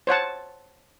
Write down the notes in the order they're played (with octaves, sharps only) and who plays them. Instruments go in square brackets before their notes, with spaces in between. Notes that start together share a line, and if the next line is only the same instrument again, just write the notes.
[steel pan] C5 C#5 F#5 A5